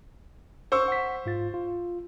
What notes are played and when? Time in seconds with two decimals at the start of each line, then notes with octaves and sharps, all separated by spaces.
0.72 C5 C#6 E6
0.88 F#5 B6
1.26 G#2 F4 A6
1.54 F4